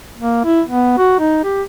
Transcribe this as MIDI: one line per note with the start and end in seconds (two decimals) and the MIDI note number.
0.18 0.44 58
0.45 0.62 64
0.68 0.93 59
0.98 1.16 66
1.19 1.41 63
1.44 1.63 67